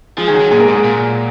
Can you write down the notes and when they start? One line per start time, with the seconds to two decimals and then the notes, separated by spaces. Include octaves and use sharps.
0.17 F3 G#3 G#4
0.28 D#3 G#4
0.34 F#3 F#4
0.40 D#3
0.51 A#2 G#3 G#4
0.59 A#3 A#4
0.68 G#2 G#3 G#4
0.84 A#2